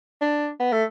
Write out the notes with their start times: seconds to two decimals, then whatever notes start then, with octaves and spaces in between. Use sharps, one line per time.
0.21 D4
0.60 B3
0.72 A3